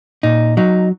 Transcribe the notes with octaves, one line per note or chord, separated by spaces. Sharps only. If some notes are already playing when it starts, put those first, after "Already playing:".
A#2 D#4
F#3 D#4